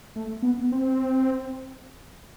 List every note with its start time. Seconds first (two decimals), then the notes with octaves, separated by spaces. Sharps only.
0.16 A3
0.42 B3
0.72 C4